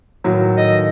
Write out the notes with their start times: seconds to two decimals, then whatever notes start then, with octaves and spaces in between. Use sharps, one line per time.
0.24 D#2 A2 F#3
0.58 A4 D#5